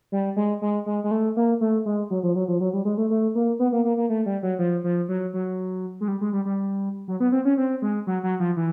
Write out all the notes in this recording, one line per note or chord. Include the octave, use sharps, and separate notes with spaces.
G3
G#3
G#3
G#3
G#3
A3
A#3
A3
G#3
F#3
F3
F#3
F3
F#3
G3
G#3
A3
A3
A#3
B3
A#3
A#3
A#3
A3
G3
F#3
F3
F3
F#3
F#3
G#3
G3
G#3
G3
G3
F#3
B3
C4
C#4
C4
G#3
F#3
F#3
F3
E3